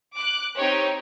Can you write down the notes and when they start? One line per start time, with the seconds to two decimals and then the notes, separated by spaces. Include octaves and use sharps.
0.15 D6 F#6
0.56 C4 D#4 G4 C#5